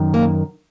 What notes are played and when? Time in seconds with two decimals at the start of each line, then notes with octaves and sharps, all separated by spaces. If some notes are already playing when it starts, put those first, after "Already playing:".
Already playing: F#2 D#3
0.14 A#3